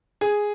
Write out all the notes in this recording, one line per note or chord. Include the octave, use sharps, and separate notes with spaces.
G#4